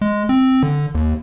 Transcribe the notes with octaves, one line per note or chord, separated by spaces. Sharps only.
G#3
C4
D3
D#2